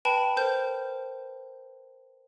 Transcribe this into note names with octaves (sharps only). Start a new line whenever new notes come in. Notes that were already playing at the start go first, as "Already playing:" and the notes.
B4 G5 A5 B5
A#4 C5 G6